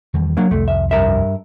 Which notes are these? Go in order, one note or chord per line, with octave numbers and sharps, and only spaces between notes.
E2 D#3 G3
F#3 A#3 D4
C2 F2 A3
E5
G2 A#4 E5